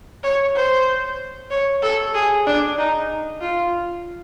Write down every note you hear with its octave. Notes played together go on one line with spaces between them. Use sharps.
C#5
C5
C#5
A4
G#4
D4
D#4
F4